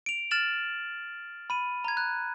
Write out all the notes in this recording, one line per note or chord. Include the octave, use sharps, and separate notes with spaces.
D7 F7
F6 A6 E7 F#7
B5 D#7
A#5 G#6
F#6